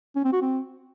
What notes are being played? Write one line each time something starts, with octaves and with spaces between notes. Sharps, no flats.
C#4
C4
F#4
C4